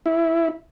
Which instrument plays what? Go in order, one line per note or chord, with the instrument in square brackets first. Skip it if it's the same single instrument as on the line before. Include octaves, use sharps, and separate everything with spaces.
[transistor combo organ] E4